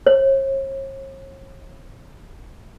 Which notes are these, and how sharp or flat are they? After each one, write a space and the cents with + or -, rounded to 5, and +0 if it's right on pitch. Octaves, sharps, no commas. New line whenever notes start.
C#5 -45